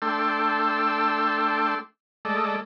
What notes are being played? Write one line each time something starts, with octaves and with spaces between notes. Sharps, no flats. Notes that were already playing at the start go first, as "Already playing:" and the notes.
A3 D4 A4 G5 C6 E6
G#3 A3 A4 D5 D#5